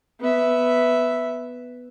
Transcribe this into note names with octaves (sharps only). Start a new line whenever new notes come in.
B3 E5